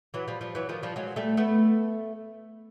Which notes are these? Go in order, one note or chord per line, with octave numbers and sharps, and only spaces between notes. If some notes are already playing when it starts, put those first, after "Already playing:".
E3 F#3
F3 G3
F3 G3
E3 F#3
D#3 F3
F3 G3
F#3 G#3
G3 A3
A3 B3